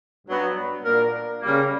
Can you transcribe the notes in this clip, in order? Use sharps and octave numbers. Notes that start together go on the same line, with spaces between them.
G2 F#3 B3
A#2 A#3 D4 A#4
C#3 G3 A#3